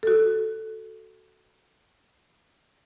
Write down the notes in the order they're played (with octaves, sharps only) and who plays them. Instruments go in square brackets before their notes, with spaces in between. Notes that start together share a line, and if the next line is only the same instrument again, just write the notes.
[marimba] F#4 A4